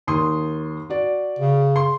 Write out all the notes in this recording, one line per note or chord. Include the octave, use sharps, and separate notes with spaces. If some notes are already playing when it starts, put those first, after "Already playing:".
D#2 C6 D#6
F#4 D5
C#3
C6